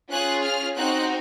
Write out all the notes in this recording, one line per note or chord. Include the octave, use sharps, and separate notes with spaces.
C#4 F4 G#4 F#6
F6
C4 D#4 F#4 F#6